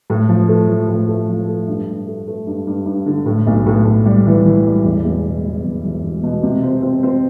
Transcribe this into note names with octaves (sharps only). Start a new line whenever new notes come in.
A2
F3
A3
F3
A2
A3
F3
A3
G2
G2
A3
A3
G2
G2
G2
D3
A2
B1
A2
A2
G3
E3
E3
G3
E1
E2
B2
E2
E1
E1
E1
B2
C3
C4
C4
C4